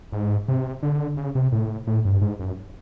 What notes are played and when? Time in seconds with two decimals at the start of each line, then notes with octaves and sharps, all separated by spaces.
0.12 G#2
0.48 C3
0.83 D3
1.17 C#3
1.35 C3
1.52 A2
1.87 A2
2.05 G2
2.22 G#2
2.40 F#2